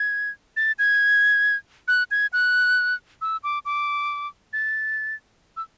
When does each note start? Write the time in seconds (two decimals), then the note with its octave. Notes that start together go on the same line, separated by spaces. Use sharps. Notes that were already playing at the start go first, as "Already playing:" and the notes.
Already playing: G#6
0.57 A6
0.79 G#6
1.88 F#6
2.11 G#6
2.33 F#6
3.21 E6
3.44 D6
3.65 D6
4.53 A6
5.57 E6